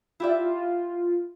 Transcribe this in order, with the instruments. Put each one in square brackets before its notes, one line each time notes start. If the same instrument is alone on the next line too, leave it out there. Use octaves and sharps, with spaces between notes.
[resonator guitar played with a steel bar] E4 G4 E5 [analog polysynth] F4 D5
[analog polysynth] F4